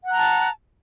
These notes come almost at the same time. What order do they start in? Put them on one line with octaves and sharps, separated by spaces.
F#5 F#6 A#5 A5